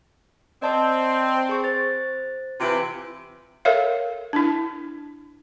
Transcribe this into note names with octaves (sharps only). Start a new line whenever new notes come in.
C4 D5 D#5 A5
G#4 C#6
C5 A6
C3 E3 F4 B4 D7
A4 A#4 C#5 E5 F5
D4 E4